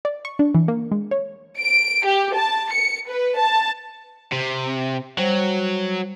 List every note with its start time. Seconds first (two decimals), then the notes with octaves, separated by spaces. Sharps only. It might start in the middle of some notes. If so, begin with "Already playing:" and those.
0.05 D5
0.25 C#6
0.39 D4
0.55 E3
0.68 A#3
0.91 G#3
1.11 C#5
1.59 D7
2.06 G4
2.36 A5
2.71 C#7
3.08 B4
3.37 A5
4.32 C3
5.18 F#3 G3 C5